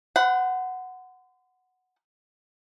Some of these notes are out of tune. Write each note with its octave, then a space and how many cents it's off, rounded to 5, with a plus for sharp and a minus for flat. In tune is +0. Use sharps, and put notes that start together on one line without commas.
C5 -40 F#5 +0 B5 +30